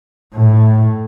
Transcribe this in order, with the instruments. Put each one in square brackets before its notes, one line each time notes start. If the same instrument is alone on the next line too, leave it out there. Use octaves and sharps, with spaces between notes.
[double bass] A2